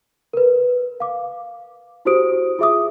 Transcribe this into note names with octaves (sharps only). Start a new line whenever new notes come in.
A#4 B4
F5 D6
E4 F#4 G4 C5 D#6 D7
F4 G#4 E5 D6 D#6